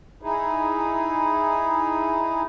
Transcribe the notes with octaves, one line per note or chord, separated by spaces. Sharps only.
D#4 E4 G#4